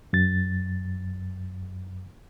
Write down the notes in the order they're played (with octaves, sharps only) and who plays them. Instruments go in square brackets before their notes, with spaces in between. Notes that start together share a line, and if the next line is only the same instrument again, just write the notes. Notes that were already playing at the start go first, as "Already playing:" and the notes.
[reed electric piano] F#2 A6